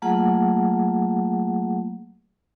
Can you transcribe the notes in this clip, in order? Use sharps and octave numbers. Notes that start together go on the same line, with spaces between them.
F#3 A3 A#3 F4 G#4 F#5